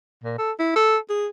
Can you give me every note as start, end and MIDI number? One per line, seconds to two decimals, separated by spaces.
0.24 0.36 46
0.38 0.52 69
0.59 0.74 64
0.76 0.97 69
1.10 1.27 68